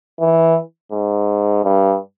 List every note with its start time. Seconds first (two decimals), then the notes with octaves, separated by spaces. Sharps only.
0.20 E3
0.92 G#2
1.65 G2